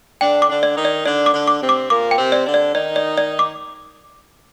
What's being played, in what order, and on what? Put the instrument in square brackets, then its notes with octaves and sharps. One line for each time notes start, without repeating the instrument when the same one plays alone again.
[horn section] D3 D4 [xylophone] G5
[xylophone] D6
[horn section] D3 D4
[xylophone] D5
[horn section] D#3 D#4
[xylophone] D5
[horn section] D3 D4 [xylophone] D5
[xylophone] D6
[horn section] D3 D4
[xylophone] D6
[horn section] C3 C4
[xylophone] D6
[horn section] A#2 A#3 [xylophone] D6
[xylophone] G5
[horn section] C3 C4
[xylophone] D5
[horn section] D3 D4
[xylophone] D5
[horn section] D#3 D#4 [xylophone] D5
[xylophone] D5
D5
D6